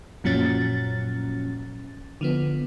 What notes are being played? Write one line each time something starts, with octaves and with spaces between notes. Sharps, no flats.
F#2 A#2 F3 F#3 C#4 A6
D3 F3 B3